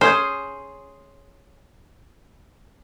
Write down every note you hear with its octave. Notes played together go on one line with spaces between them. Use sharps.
C#4 G#4 C5